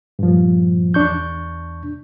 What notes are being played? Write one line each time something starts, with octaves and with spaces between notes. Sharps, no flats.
G2 A#2 F3
E2 D4 C#6 G6